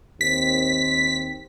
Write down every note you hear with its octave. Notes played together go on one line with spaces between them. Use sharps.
D#2 C4 B6